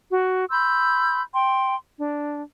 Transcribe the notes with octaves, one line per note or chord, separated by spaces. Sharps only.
F#4
B5 C6 E6 G6
G5 C6
D4